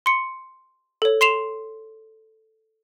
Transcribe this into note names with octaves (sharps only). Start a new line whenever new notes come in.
C6 C#7
A4 C#5
C6 C7 E7 F7